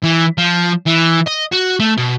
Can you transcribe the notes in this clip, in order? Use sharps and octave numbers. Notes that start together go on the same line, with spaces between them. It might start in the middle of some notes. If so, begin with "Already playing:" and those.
E3
F3
E3
D#5
F#4
A3
B2